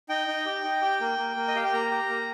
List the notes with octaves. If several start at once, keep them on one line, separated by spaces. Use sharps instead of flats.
D#4 G5
D#4
G4
D#4
G4
A#3
A#3
A#3
D#5
G4 F5
G5
A#3 A#5
G4
A#3